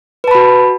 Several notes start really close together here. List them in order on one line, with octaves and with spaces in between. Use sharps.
B4 A5 B5 F#4